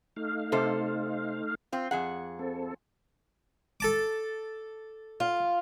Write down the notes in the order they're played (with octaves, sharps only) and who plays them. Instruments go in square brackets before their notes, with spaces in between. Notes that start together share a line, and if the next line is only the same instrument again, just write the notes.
[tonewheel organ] A3 D#4 F5
[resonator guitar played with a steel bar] C3 A4 C5
C4 F4
F2 G#4 F#5
[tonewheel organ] C4 A4
[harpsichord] A4 A5 D6
[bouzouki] F4